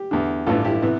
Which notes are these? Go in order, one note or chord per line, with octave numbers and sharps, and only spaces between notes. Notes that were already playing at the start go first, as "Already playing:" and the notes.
Already playing: G4
E2 D3
A1 G2 E3 F4 A4
E4 G4
C3 E3 B3